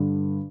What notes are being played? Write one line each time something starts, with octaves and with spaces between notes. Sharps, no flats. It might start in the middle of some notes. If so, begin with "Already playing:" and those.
Already playing: G2 D3